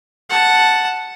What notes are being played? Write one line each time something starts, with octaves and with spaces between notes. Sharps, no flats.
F#5 A5